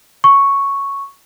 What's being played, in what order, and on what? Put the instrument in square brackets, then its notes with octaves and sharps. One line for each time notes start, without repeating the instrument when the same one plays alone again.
[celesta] C#6